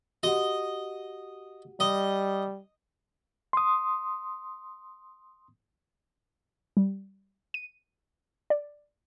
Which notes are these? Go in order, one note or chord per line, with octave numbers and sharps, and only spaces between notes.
F#4 G4 D#5 F#5
G3 D#5
C6 D#6
G3
D#7
D5